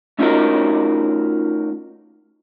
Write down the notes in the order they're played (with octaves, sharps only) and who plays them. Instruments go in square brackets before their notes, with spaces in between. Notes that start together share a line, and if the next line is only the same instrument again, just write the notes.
[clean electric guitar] A3 C#4 D#4 F4 F#4 A#4